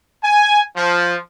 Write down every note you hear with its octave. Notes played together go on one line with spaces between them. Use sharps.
G#5
F3